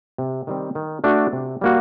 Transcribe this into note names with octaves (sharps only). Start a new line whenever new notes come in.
C3
D#3 G3 C4
D#3
A3 D4 F#4
C3
G3 A#3 F#4